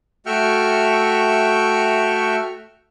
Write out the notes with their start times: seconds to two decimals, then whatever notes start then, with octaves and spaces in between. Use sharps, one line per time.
0.26 A3 F#4 E5 G5 C#6 F6